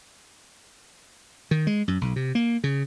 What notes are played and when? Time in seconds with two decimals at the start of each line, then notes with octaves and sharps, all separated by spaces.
1.51 D#3
1.67 G#3
1.88 F#2
2.01 B1
2.16 C3
2.35 A#3
2.64 C#3